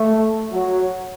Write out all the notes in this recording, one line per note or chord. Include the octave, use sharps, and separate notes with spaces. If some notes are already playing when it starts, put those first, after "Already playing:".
Already playing: A3
F#3